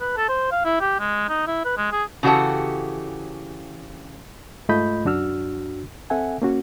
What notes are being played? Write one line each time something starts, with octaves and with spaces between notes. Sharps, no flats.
B4
A4
C5
F5
E4
G4
G#3
D#4
E4
B4
G#3
G#4
C#3 E3 F#4 G4 A4 F#5
G#2 A3 F4 D#5 B5 G6
C2 F#2 D4 F#4 E6 F6
C4 A4 E5 F#5 G#5
A#3 C#4 F#4